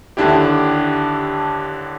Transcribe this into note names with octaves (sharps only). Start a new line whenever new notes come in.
D#2 D3 D4 E4 G4